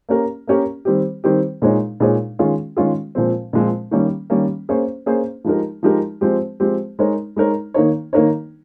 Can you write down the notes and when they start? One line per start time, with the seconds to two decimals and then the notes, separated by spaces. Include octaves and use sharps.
0.09 A#3 C#4 G4 A#4
0.47 A#3 C#4 G4 A#4
0.85 D#3 G3 C4 G4
1.24 D#3 G3 C4 G4
1.62 A#2 G#3 D#4 G#4 C#5
2.00 A#2 G#3 D#4 G#4 C#5
2.39 D#3 G#3 C#4 F4 G#4
2.77 D#3 G#3 C#4 F4 G#4
3.15 A#2 F3 G#3 C4
3.53 A#2 F3 G#3 C4
3.91 D#3 G3 A#3 C#4
4.30 D#3 G3 A#3 C#4
4.69 A#3 C#4 G#4 C5
5.06 A#3 C#4 G#4 C5
5.44 F3 G#3 D#4 G4 A#4
5.83 F3 G#3 D#4 G4 A#4
6.21 F3 G#3 C4 G4
6.60 F3 G#3 C4 G4
6.99 G#3 D#4 A#4 C#5
7.36 G#3 D#4 A#4 C#5
7.74 D#3 A#3 D#4 A#4 C#5
8.13 D#3 A#3 D#4 A#4 C#5